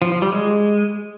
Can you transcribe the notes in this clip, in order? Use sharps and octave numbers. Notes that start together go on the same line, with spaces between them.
F3
F3
G3
G#3